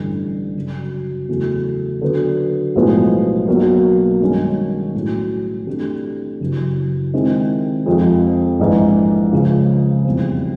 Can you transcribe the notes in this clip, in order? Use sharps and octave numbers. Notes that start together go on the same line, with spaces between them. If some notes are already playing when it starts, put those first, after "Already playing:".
Already playing: A1 G2 D3
F#2 C#3 F#3
E2 C#3 F#3 A3 C#4
D3 F#3 B3
B1 A2 F3 G#3 B3
B1 B2 F#3 A#3
G2 D#3 G#3 C#4
A2 F#3 B3
C3 E3 A3 D4 G4
F#1 F#2 C#3 E3
C3 D#3 G#3 C4 E4
F2 C3 F3 G#3
A#1 G#2 E3
C#2 C#3 F3 G#3
F1 E2 B2 G3 C4